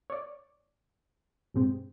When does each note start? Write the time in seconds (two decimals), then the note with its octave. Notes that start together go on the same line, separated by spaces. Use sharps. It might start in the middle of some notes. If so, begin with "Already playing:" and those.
0.10 C#5 D5
1.54 G2 B2 G#3 C4